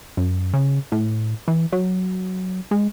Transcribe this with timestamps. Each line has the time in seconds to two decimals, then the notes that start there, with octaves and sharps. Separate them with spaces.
0.17 F#2
0.53 C#3
0.92 A2
1.48 E3
1.72 F#3
2.71 G#3